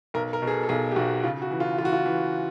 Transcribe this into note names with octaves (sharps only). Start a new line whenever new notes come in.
B1 A#4
A#4
B2
G#4
A4
A4
B1 G#4
G4
B1 F#4
C#3 F4
F#4
E3
F4
E3 F4
F#4
F4
E3